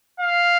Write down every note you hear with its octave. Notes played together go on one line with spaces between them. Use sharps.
F5